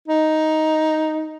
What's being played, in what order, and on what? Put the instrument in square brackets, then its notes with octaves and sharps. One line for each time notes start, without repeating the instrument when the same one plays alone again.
[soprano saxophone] D#4